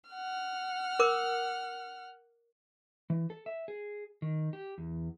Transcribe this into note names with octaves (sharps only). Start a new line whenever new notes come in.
F#5 F6
A#4 D6
E3
A4
E5
G#4
D#3
G4
E2